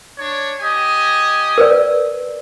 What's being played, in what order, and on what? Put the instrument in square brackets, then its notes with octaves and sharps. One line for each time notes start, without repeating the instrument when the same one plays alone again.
[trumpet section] D4 C#5
G4 D#5 G#5
[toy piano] A#4 B4 D5